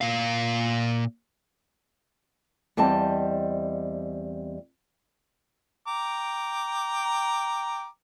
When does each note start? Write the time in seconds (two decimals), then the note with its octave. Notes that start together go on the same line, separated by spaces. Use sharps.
0.01 A#2 F5
2.77 E2 G3 C4 D#5 A5
5.87 G5 A#5 D6